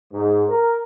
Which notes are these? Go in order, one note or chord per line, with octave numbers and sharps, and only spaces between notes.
G#2
A#4